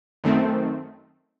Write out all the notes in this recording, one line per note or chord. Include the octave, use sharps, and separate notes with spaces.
F#2 D#3 A3 C4